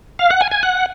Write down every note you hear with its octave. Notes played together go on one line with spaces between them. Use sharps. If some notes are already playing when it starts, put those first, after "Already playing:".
F5
F#5
G#5
G#5
F#5